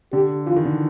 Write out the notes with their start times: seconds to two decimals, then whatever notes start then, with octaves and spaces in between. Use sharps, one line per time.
0.13 D3 G4
0.47 E3 F4
0.56 D#3
0.65 D3